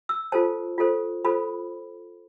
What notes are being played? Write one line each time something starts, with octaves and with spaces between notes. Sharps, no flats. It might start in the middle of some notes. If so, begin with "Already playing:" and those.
E6
F4 A4 C5 A5
F4 A4 C5
F4 A4 C5 B5